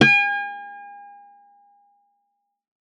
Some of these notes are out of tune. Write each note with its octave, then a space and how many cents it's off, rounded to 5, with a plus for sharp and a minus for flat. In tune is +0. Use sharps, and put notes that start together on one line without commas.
G#5 -40